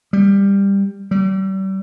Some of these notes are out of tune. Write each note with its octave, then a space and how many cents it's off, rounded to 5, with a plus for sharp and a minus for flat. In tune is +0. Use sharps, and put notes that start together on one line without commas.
G3 +15
G3 -35